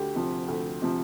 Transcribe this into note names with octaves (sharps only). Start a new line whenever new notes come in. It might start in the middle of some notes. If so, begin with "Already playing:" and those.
Already playing: D2 G4
C3 F3
D2
C3 F3